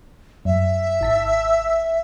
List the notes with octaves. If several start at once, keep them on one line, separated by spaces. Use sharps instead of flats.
F#2 E5
G#1 A5 B6